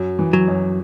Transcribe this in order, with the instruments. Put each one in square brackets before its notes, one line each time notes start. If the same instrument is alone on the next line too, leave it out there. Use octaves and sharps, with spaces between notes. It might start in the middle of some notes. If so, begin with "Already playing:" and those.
Already playing: [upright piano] F#2
E3
[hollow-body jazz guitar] F#3
[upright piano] F#2